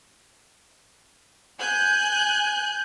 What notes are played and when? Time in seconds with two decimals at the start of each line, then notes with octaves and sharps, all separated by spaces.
1.58 G#5 F#6 G6